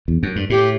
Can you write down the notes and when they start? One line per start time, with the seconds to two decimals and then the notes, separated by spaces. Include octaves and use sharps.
0.08 E2
0.23 F#2
0.36 G2
0.50 A2 G4